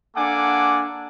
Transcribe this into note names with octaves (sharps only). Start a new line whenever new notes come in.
A#3 D4 A4 F#5 G#5 D6